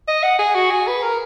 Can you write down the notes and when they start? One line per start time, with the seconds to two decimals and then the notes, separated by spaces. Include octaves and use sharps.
0.08 D#5
0.23 F#5
0.39 G#4
0.55 F#4
0.71 G#4
0.87 B4
1.03 A#4